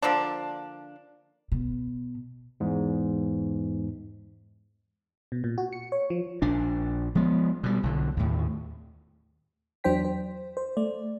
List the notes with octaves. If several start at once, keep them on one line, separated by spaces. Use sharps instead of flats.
D3 F3 A#3 D4
B2
E2 G#2
B2
A#2
F#4
C#7
C#5
F3
A#1 D4
F3 G#3 B3
B2 G3
B1 D3
D#2 A2
E2 F#3 D4 C5 G5 B6
C5
C5
A3 D5